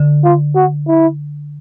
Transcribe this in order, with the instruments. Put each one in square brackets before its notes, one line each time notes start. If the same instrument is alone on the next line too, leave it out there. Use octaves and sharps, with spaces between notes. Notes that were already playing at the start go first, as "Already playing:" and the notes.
Already playing: [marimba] D3
[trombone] F4
F#4
E4